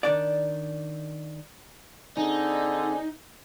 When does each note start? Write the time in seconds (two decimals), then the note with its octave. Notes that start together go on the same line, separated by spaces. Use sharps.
0.03 D#3 D4 D5
2.17 D3 C4 D4 D#4 G#4